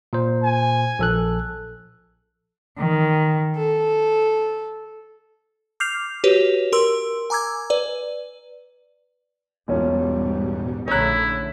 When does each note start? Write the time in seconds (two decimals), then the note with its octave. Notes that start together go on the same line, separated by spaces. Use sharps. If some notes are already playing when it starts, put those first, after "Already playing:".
0.13 A#2 C5
0.44 G#5
0.99 A#1 A4 F#6
2.78 D#3
3.56 A4
5.80 D6 F6 G6 C7 F7
6.24 F#4 G4 B4 C#5
6.72 A#4 C6 E6
7.30 G#5 A#5 D6 E6 G#6
7.70 B4 D5
9.68 E1 G#2 B2 G3 C#4 F4
10.88 A#1 D3 A3 C#4 E4 C#5 A#5 F#6